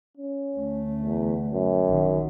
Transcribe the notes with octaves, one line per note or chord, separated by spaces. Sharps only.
C#4
D2 A3
E2
F#2
A#1 D#3